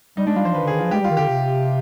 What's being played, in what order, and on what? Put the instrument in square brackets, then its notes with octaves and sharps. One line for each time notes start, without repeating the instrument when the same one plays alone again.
[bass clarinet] G3 [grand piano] D#4
[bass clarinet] G#3 [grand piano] D4
[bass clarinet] G3 [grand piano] F4
[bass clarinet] F3 [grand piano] C5
[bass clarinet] D#3 [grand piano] B4
[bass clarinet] D3
[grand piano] G#4
[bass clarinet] D#3
[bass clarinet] F3 [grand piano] F4
[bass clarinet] G#3 [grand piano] G4
[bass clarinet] G3
[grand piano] F4
[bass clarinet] D#3
[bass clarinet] D3 [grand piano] G4
[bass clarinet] C3